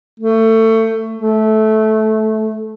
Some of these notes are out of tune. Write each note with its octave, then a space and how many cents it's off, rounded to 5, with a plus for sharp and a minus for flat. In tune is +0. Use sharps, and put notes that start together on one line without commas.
A3 +25
A3 -15